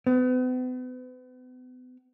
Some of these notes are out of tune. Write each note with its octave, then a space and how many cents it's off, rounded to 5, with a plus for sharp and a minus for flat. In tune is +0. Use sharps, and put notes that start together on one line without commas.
B3 +40